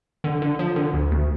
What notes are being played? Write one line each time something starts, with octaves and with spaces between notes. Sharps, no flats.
D3
D3
F3
D3
D2
D2